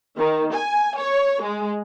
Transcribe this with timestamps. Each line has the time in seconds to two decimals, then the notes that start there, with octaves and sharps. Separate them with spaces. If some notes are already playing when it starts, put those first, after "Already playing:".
0.18 D#3
0.55 G#5
1.00 C#5
1.43 G#3